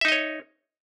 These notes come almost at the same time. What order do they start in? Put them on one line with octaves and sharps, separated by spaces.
E5 D#4 D#5 C#5